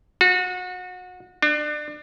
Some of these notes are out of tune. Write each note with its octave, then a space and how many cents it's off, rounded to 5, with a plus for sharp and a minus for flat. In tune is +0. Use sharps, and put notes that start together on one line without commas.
F#4 -30
D4 +30